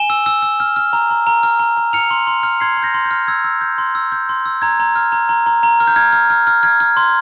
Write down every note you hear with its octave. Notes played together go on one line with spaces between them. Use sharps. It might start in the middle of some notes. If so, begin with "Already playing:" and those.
Already playing: G#5 E7 G7
E6
E6
E6
F6
F6
A#5
A#5
A#5
F6
A#5
A#5
F6 C#7 F7
C6
C6
F6
C6 G#6 C7
C6
G6 A#6
C6
G6
F6
E6 G#6
E6
G6
C6
E6
G6
C6
E6
A#5 G#6
A#5
F6
A#5
A#5
A#5
A#5
F6
G6
F6 G#6
F6
F6
F6
F6 G#6
F6
C6